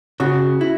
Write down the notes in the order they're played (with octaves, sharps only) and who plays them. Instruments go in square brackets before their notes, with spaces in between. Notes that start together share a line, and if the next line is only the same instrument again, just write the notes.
[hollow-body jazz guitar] C#3 [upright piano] F#4
[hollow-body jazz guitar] E4